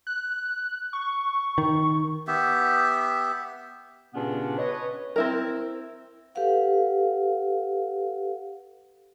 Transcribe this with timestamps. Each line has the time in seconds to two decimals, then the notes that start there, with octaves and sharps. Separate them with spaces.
0.07 F#6
0.93 C#6
1.58 D#3
2.27 B3 G4 E5
4.14 G2 A#2 C#3 B3 C#4 D4
4.58 B4 C#5 D#5
5.16 C4 E4 A#4
6.35 G4 A4 B4 F5 F#5